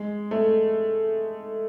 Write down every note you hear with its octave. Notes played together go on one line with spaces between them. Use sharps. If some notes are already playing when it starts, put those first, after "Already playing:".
Already playing: G#3
A3